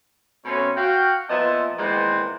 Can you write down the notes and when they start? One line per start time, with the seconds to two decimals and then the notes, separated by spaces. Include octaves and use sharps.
0.45 B2 A3 C4 C#4
0.76 F#4 F5 G5
1.29 A#2 F3 B3 D#5 E5 A5
1.79 A#2 D#3 E3 G#3 B3 C4